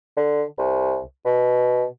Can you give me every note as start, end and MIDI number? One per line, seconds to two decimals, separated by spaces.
0.17 0.43 50
0.58 1.00 36
1.25 1.85 47